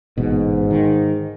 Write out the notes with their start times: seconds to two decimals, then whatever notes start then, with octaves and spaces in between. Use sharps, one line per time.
0.18 A1 G#2 B2
0.71 D#3